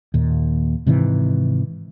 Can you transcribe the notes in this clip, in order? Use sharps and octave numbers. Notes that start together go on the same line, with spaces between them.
D#2 A#2
G#2 C3 D#3 E3